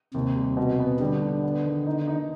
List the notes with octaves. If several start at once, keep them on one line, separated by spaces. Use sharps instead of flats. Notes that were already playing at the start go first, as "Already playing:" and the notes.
D#2 C3
G3
B2
B3
D3 G3
D4
B3
D#3
D#4
D#4